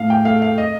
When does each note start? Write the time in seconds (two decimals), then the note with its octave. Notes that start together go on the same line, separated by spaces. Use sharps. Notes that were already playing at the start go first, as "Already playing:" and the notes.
Already playing: A2 F5
0.10 G5
0.25 A3 F5
0.42 F5
0.58 D#5